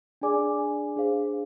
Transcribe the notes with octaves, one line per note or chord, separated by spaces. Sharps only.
D4 G#4 D5 G#5 D6
D4 G#4 C5 F5